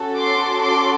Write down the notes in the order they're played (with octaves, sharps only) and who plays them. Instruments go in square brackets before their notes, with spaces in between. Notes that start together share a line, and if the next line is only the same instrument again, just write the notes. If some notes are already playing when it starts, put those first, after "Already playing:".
Already playing: [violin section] C#4 F#4 A4
C6 D6
C6 D6